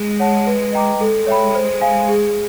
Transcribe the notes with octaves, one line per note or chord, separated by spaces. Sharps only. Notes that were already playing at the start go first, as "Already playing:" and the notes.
Already playing: G#3 G#4
C#5 F#5 A5
B4
D#5 G5 A#5 D6
G#3 A4
C#5 E5 G5 B5
C5
F5 G#5
G#4